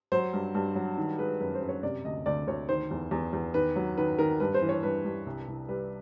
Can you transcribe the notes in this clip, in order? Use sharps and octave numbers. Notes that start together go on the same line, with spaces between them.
F#3 C5
G2
G2
F#3
D#3
G#3 B4
F#2 B4
C5
F#2
C#5
C3 D5
D2 D#5
D2 D5
D2 C#5
D#3 C5
E2
E2
E2
D#3 B4
F#3
D#3 B4
D#3 A#4
G2 B4
C5
E3
C#5
G2 B4
G2
C2
C2
G3 B4